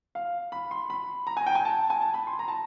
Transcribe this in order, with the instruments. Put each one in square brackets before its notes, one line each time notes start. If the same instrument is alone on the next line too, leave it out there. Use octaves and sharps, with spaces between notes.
[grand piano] F5
B5
C6
B5
A#5
G#5
G5
G#5
A5
G#5
A5
B5
C6
A#5
A5